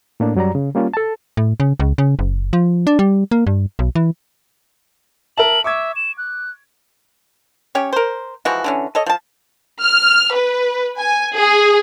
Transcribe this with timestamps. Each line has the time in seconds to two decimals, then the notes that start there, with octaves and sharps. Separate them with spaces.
0.20 A2 A#3 D4
0.35 F#2 F#3 G3 D5 A#5
0.55 C#3
0.75 G3 A#3 C#4 F4
0.94 A4 A5
1.37 A2
1.60 C#3
1.80 C#2
1.98 C#3
2.19 F#1
2.53 F3
2.87 D4
2.99 G3
3.31 A#3
3.47 G2
3.79 B1
3.95 E3
5.38 A#4 E5 A5 F#7
5.64 E5 C#6 D6 G#6
5.96 E7
6.18 F#6
7.75 C#4 G4 C#5
7.93 A#4 C5
8.45 E3 F3 G#3 F#4
8.64 D3 E3 C#4
8.95 A4 C#5 D#5
9.06 F3 A5
9.82 F6
10.34 B4
11.00 G#5
11.36 G#4